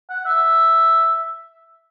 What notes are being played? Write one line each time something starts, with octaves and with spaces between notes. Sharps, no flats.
F#5
E5